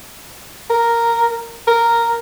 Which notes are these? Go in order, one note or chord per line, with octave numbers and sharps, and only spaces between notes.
A#4
A#4